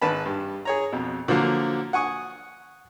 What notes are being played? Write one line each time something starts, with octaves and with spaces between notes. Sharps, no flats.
G#1 B4 A5 B5
G2
G#4 C#5 A#5
F2 B2
D3 F3 F#3 A#3
F#5 G#5 C#6 D#6